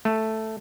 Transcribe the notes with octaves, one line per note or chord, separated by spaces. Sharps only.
A3